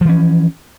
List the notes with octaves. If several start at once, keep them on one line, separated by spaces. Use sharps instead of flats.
E3 F3 C#4